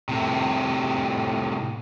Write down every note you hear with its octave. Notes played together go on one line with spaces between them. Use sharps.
A2 C3